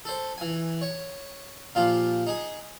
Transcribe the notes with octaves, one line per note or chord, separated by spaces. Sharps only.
A4 C5
E3 G#5
C#5
A#2 F3 F4 G4
D#4 G#4